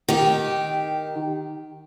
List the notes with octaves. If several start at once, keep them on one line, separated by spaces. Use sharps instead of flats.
D#3 G4